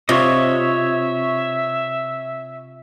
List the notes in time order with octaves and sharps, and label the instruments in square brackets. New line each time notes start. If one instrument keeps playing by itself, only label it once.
[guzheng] C3 [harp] F4 [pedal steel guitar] C#5 D#5 [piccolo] E5